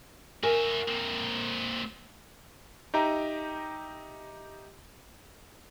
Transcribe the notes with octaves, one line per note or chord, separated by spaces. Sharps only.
F#4 A#4 E5 G#5
A#3 C4
D#4 G4 D#5 E5 G5 A#5